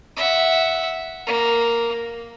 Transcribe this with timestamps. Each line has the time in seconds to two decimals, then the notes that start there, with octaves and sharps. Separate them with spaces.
0.16 E5 F#5
1.27 A#3